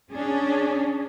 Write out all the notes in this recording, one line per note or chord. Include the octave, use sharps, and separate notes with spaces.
C#4 D4 G#4